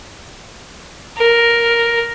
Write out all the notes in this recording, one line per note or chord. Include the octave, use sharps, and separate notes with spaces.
A#4